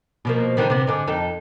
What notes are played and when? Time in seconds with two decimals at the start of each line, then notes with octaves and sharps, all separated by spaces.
0.25 B2 F3 A#3
0.57 D3 D#3 G3
0.70 C3 B3
0.87 G#2 D3
1.07 F2 D#4 A4